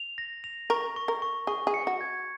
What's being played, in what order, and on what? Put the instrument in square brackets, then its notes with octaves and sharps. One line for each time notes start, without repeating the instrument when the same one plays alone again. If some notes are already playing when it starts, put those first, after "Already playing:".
Already playing: [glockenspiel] F7
A#6
F7
[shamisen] A#4 [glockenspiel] C#6
[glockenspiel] C#6
[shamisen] A#4
[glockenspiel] C#6
[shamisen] G#4 [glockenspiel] C#6
[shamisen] G#4
[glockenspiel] C#7
[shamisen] F#4
[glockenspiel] G#6